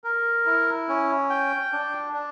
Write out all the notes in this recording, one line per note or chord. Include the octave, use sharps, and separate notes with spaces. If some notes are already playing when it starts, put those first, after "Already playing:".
A#4
E4
C#4
G5
D4
D4